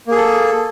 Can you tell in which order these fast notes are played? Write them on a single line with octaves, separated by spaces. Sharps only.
A#3 G#4 A4